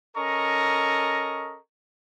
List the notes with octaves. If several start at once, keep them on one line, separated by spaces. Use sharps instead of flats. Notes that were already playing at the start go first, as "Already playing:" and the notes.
C#4 A4 A#4 D#5 A#5 C#6